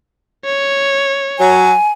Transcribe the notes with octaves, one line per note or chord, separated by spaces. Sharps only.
C#5
F#3 G#5